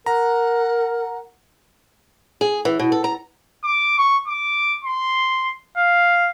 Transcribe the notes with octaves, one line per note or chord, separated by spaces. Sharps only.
A#4 F#5 A#5
G#4
E3
B2
A4
A#5
D6
C#6
D6
C6
F5